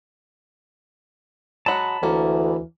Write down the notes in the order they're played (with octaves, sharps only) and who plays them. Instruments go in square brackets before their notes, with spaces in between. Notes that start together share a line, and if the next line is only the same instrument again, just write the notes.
[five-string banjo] F#3 G#3 F#4 [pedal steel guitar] A5 B5
[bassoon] D2 [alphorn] E3 [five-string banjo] A#3 C#4